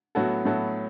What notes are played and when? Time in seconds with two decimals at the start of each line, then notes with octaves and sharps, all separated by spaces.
0.15 A2 F#3 B3 F#4 A4
0.45 A2 F#3 B3 F#4 A4